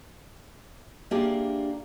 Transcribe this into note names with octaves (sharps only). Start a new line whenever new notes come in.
A#3 D4 F4 G4 G#4 E5